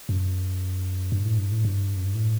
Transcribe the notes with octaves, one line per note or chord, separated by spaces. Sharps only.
F#2
G2
A2
G2
A2
G2
F#2
G2
A2